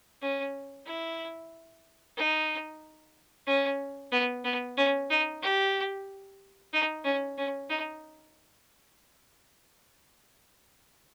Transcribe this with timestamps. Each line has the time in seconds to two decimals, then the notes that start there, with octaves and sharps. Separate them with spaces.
0.22 C#4
0.86 E4
2.17 D#4
3.47 C#4
4.12 B3
4.44 B3
4.77 C#4
5.10 D#4
5.42 G4
6.73 D#4
7.04 C#4
7.38 C#4
7.70 D#4